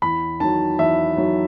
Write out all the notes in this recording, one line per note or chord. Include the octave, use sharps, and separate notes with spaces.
E2 B5
D#3 F#3 A5
E2 E5
D#3 F#3